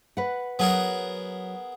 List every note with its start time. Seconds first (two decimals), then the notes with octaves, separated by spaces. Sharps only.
0.17 B4 F#5
0.59 F#3 B3 G#4 A#4